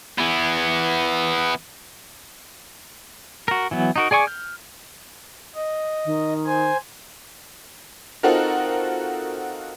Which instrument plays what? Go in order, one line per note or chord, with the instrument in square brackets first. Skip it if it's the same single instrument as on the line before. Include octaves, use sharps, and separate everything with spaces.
[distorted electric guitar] E3 B3
[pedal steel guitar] F#4 A#4
E3 F#3 B3
D#4 F#4 A#4
G#4 D5 G#5 C#6 D6
F6 G6
[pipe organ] D#5
[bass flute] D#3
[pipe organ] C5 G#5
[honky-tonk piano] C4 D#4 F4 F#4 A4 A#4